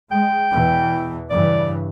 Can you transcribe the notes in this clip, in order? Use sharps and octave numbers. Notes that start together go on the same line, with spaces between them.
G#3 G5
E2 B2 E3
G2 C#3 E3 D5